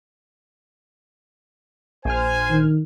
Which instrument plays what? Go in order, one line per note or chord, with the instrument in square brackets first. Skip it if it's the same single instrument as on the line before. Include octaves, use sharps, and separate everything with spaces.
[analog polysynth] A#1 F6 [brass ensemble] C5 G#5
[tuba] D#3